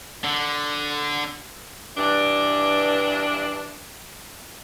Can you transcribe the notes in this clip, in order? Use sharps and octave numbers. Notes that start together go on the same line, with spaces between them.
D3
G2 E3 D4